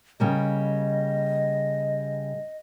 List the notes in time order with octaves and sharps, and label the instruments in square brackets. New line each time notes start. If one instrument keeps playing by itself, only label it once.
[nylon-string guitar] C#3 G3 A#3 [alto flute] D#5